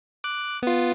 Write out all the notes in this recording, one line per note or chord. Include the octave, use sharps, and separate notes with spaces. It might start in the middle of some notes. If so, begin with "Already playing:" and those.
D6 F#6
B3 F4